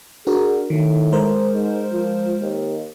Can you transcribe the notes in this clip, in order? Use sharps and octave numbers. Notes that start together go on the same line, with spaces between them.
D4 F#4 G#4 A#4
A2 D#3
G#3 A#4 C5
G#2
F3
D#2